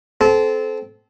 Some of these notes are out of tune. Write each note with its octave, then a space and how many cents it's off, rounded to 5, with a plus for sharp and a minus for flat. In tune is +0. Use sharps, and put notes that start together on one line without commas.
C4 -15 A4 -25